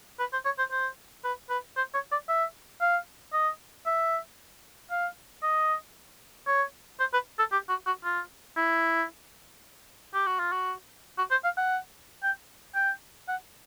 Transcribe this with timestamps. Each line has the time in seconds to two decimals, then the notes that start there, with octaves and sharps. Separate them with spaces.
0.19 B4
0.33 C5
0.45 C#5
0.58 C5
0.71 C5
1.24 B4
1.49 B4
1.77 C5
1.94 C#5
2.12 D5
2.28 E5
2.81 F5
3.33 D#5
3.86 E5
4.91 F5
5.43 D#5
6.47 C#5
7.00 C5
7.13 B4
7.39 A4
7.52 G4
7.69 F#4
7.86 F#4
8.04 F4
8.56 E4
10.14 G4
10.27 F#4
10.39 F4
10.52 F#4
11.18 F#4
11.31 C5
11.44 F5
11.57 F#5
12.23 G5
12.75 G5
13.28 F#5